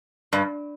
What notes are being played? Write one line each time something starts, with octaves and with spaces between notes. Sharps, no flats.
G2